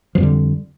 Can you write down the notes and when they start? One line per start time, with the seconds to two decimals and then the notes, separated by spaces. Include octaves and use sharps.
0.15 F3
0.18 F2
0.20 G3
0.23 D3